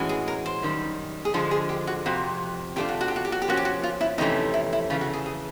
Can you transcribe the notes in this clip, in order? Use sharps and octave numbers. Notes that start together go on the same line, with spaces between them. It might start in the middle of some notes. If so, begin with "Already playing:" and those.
Already playing: A2 E3 G#3 C#4 F#4
G#4
A#4
C5
F#2 D#3 G3
G#4
D3 F3 G#3 A4
G#4
G4
F#4
F2 C3 F#4
C3 F3 A3 D4 F4 G4
F#4
F#4
G4
F#4
G4
F#4
G4
F3 A#3 C#4 F#4
G4
F#4
F4
E4
F2 C3 E3 A3 C#4 D#4
E4
E4
C#3 E3 A3 F4
F#4
G#4
G#4